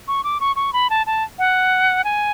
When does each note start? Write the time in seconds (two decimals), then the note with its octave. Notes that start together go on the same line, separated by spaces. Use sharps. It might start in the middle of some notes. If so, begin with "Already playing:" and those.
0.08 C#6
0.24 D6
0.40 C#6
0.56 C#6
0.73 B5
0.90 A5
1.06 A5
1.39 F#5
2.04 G#5